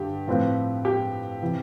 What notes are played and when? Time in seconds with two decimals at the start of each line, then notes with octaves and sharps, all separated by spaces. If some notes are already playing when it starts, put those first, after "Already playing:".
Already playing: G2 D3 G4
0.28 A2 F3 C4 F4 B4
0.85 G4
1.42 C3 E3